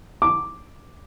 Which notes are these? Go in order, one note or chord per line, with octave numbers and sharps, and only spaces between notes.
D6